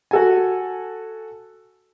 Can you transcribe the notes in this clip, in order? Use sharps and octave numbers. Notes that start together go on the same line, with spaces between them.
F#4 A4 G#5